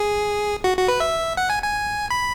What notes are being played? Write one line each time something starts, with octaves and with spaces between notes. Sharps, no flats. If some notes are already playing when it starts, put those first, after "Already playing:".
Already playing: G#4
F#4
F#4
B4
E5
F#5
G#5
G#5
B5